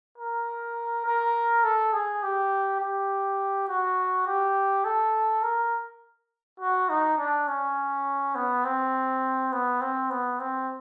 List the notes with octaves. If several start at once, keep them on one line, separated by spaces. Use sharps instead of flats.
A#4
A#4
A4
G#4
G4
G4
F#4
G4
A4
A#4
F#4
D#4
D4
C#4
B3
C4
B3
C4
B3
C4